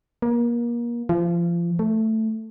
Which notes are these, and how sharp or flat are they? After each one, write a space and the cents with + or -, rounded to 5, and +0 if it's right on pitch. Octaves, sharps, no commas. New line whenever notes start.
A#3 +30
F3 -30
A3 +5